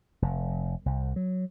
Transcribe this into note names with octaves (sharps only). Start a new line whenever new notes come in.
F1
C2
F#3